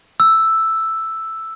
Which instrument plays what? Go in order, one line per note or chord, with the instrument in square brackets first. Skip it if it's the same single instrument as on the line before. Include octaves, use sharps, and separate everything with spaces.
[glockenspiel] E6